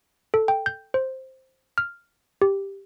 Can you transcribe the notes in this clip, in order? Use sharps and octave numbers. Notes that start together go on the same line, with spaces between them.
A4
G5
G6
C5
F6
G4